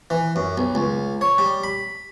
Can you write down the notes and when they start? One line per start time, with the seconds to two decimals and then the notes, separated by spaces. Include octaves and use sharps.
0.10 E3
0.36 F#2
0.58 B1
0.75 C#2
1.21 C#5
1.38 G3
1.64 B5